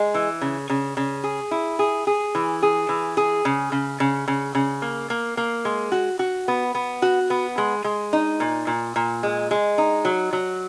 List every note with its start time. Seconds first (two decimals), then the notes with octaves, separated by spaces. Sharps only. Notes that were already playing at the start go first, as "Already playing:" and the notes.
Already playing: G#3
0.14 E3
0.41 C#3
0.70 C#3
0.97 C#3
1.24 G#4
1.51 E4
1.79 G#4
2.07 G#4
2.35 E3
2.62 G#4
2.89 E3
3.17 G#4
3.45 C#3
3.72 C#3
4.00 C#3
4.28 C#3
4.55 C#3
4.82 A#3
5.10 A#3
5.37 A#3
5.65 G#3
5.92 F#4
6.19 F#4
6.48 B3
6.75 B3
7.02 F#4
7.30 B3
7.58 G#3
7.84 G#3
8.13 D#4
8.40 A#2
8.67 A#2
8.96 A#2
9.23 G#3
9.51 G#3
9.78 D#4
10.05 F#3
10.33 F#3